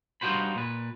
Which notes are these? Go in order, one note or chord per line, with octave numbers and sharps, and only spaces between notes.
G2 D#4 F4 F#4 C5 B5
A#2 B4